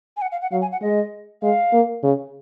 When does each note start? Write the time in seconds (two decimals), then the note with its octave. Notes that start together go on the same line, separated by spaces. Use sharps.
0.17 G#5
0.22 F#5
0.32 F5
0.42 F#5
0.52 F#3 F5
0.62 G#5
0.72 F#5
0.82 G#3 D#5
1.42 G#3 F5
1.73 A#3
2.04 C#3